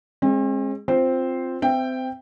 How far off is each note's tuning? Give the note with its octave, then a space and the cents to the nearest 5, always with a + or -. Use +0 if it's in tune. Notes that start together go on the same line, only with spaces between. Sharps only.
G#3 +0 C4 +45
C4 +0 F4 +0 C5 +0
C4 -25 E5 +20 G5 +5